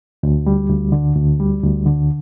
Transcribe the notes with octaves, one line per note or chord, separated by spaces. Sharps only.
D2
G3
D2
D3
D2
G3
D2
D3